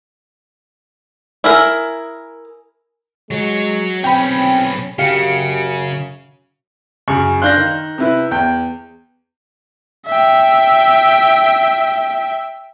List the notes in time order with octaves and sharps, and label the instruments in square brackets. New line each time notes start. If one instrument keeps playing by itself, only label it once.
[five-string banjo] E4 G#4 A#4
[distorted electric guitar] F#3 C#5 [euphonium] G#3
[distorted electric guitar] B1 C#4 [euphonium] C4 [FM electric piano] G5 B5
[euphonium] F#2 [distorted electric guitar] C#3 [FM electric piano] G4 F5 C#7
[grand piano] F#2 C#3 [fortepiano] C#6
[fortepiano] D4 F5 C6 [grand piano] F#6 G6 A#6
[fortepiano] D#3
C3 E4 B4
E2 G5
[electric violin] E5 G5